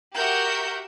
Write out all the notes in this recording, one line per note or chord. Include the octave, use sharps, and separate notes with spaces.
F#4 G4 A#4 E5 F#5 G6